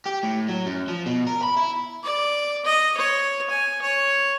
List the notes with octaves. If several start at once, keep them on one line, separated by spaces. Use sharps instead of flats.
G4
A2
F#3
F#2
F3
B2
A#4
B5
E4
D5
D#5
C#5
G#5
C#5